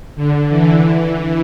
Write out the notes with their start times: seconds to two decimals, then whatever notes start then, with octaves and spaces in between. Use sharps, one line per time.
0.16 D3
0.50 E3
0.84 E3